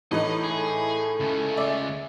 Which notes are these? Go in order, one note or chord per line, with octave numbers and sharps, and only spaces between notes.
A2 E3 D#4 D#5
A3 G#4
C#2 C#3
D5 E5